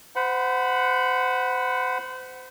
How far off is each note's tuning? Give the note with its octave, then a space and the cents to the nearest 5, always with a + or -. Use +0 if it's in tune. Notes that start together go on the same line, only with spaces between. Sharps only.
C5 -30 F#5 +0 B5 +0